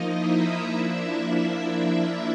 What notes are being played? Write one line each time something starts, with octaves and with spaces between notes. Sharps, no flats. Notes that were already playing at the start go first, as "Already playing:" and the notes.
Already playing: F3 A#3 D#4 D#5
E4 E5
F3 A#3 D4